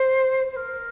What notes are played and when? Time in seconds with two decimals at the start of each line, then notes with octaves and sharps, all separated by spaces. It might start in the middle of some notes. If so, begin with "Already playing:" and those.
Already playing: C5
0.52 C5
0.56 A#4